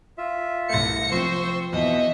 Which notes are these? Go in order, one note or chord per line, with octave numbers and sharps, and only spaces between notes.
F4 E5
C2 A3 A#6 C#7
F3 C4 C5 C6 C#6 E6
E2 B2 D#5 E5